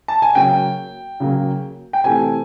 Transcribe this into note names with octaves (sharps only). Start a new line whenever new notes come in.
A5
G#5
C#3 F#3 A#3 G5
C#3 F#3 A#3
G5
C3 E3 A3 G#5